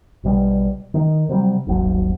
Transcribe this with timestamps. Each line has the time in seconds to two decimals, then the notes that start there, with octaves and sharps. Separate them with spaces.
0.23 A#1 B2 G3
0.94 D#3
1.29 C3 F#3 G3
1.67 D#1 G#1 F#3